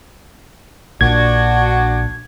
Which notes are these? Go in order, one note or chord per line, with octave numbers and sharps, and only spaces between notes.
A#1 D4 F#4 G#6